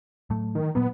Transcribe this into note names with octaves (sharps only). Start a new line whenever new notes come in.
A2 F#3 A3
D#3
A#2 F#3 A#3 B3